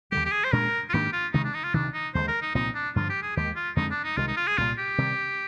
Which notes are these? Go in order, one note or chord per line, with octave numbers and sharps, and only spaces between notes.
D#2 D3 G3 G4
G4
G#4
C5
A#2 G#3 D4 A#4
F4
G#2 D#3 A#3 D4 G4
F4
C3 D#3 G#3 D#4
D4
D#4
F4
D2 C3 D#3 D4
D#4
D#2 D3 G#3 C5
A#4
D#4
C2 A#2 F3 C4 D#4
D4
G2 D3 F3 F4
G4
G#4
D#2 D#3 G#3 G4
F4
F2 D3 G#3 C4 D#4
D4
D#4
C2 C3 D#3 G#3 F4
D#4
F4
G#4
C2 A#2 G3 F4
G4
C3 D#3 G3